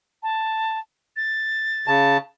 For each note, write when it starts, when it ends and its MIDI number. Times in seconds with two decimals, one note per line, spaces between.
0.23 0.79 81
1.16 1.90 93
1.88 2.17 49
1.88 2.17 81